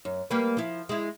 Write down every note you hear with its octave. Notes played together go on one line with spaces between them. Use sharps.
F#2
G3 A#3 B4
F3 E4
G#3 E4